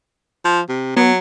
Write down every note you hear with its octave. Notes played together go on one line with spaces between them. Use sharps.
F3
C3
F#3 B3